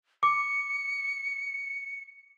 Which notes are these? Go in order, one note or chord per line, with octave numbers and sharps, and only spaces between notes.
D6 C#7